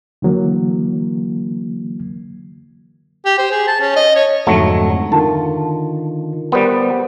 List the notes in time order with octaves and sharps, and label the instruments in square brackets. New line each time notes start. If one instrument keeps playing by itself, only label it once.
[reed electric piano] D3 E3 F#3 A#3
[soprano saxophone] G4
C5
G#4
A5
C#4
D#5
C#5
[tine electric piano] F2 G#2 D3 [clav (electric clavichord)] F#3 A3
[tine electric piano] D3 D#3 F4 [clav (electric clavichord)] A5
[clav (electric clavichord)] G3 B3 [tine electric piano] A#4 C5